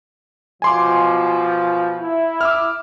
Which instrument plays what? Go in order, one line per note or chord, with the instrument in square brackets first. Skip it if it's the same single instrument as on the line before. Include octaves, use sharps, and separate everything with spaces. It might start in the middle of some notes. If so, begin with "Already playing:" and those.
[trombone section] B2 F3 [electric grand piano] G#5 C6 D6
[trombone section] E4
[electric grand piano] D6 E6 F6